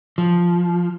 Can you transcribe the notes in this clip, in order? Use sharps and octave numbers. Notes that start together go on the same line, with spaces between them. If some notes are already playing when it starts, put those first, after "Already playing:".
F3